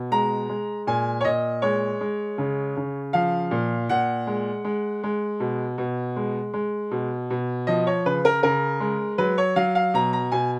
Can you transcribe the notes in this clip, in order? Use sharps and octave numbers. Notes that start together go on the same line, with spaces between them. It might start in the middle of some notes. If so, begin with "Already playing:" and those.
Already playing: B2
G#3 A#5
G#3
A#2 G#5
C#5
A#2 D#5
G#3 C#5
G#3
C#3
C#3
F3 F5
A#2
A#2 F#5
G#3
G#3
G#3
B2
B2
G#3
G#3
B2
B2
F3 D#5
C#5
C#3 B4
A#4
C#3 A#4
G#3
F#3 B4
C#5
F#3 F5
F5
B2 A#5
A#5
B2 G#5